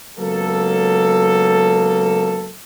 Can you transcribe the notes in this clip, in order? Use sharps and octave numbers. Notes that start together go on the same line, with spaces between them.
C#2 F#3 A#3 B3 A4